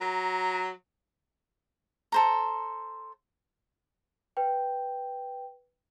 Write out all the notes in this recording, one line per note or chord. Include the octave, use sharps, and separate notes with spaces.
F#3 A#5
A4 C5 A#5
B4 G5